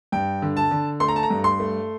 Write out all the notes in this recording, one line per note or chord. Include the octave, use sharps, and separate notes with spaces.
G2 G5
D3
A5
D3
A3 C6
A#5
A5
A#5
G2
C6
A3